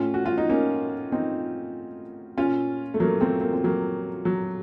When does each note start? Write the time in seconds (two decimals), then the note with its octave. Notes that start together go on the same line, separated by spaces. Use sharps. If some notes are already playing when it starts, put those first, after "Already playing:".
Already playing: A2 C#4 F4
0.14 F#4
0.26 F4
0.38 D#4
0.49 A#3 C#4
1.12 C4 D#4
2.37 A#2 C#4 F4
2.94 A3
3.00 F#3 A#3
3.21 A3 C4
3.41 A#3
3.53 C4
3.64 F#3 A#3
4.25 F#3